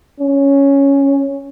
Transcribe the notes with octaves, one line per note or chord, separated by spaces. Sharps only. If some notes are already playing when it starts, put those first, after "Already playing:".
C#4